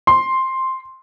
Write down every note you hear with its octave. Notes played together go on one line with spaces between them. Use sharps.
C6